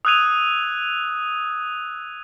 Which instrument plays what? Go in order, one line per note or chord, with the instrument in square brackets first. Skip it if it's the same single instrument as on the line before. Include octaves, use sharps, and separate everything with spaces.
[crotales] D#6 E6 F#6 G#6 D#7 F7